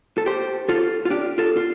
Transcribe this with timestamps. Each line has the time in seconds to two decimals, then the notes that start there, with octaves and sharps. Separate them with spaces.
0.18 A4
0.26 G4 C5
0.69 F4 A4
1.05 F4
1.10 D4 G4
1.38 F4 A4
1.56 F4